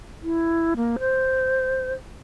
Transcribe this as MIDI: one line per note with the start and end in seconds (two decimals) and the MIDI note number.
0.23 0.74 64
0.76 0.97 58
0.99 1.93 72